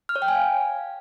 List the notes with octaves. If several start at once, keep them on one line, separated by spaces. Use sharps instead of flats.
F6
C#5
G5
G#5
F5